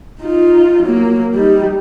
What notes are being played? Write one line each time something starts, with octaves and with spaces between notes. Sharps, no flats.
D#4 F4
F#3 A#3
G3 D#4